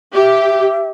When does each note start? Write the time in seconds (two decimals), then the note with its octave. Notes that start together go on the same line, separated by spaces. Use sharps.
0.16 G4 E5